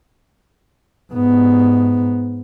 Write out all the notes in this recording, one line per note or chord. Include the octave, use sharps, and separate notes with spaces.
G#2 B3